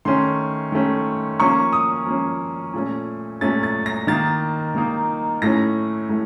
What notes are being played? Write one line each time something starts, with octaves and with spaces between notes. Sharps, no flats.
D#3 A3 C#4 C6
D#3 A3 C#4
F3 A#3 C#4 C#6
D#6
F3 A#3 C#4
A#2 A3 C#4
A#2 A3 C#4 A6
A6
A#6
D#3 A#3 D#4 A6
D#3 A#3 D#4
A2 A3 C#4 A#6
A2 A3